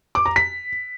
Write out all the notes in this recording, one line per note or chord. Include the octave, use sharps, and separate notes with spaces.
D6
A#5
B6